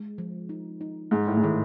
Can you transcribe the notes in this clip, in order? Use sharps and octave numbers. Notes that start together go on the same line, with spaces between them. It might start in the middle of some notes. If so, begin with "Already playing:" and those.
Already playing: G#3
F3
D#4
D#4
G#2 G#3
A2
G#2
A2 D#3